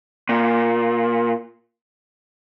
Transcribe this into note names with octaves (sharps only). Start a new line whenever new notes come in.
A#2